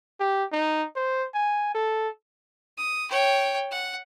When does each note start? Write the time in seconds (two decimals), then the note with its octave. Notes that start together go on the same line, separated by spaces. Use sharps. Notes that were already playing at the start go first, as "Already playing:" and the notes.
0.20 G4
0.52 D#4
0.96 C5
1.34 G#5
1.74 A4
2.78 D#6
3.11 C#5 G5
3.71 F#5